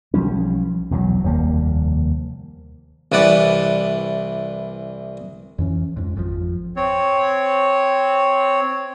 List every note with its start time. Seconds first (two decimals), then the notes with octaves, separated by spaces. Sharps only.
0.14 B1 F3 G3 C#4
0.91 B1 E2 D#3 F#3
1.23 F1 D#2 G3 A#3
3.12 C2 E3 B4 D5 F#5
5.58 F2 E3 C#4
5.97 F2 G#2
6.16 G#1 F2 C#3 F3
6.76 C4 C#5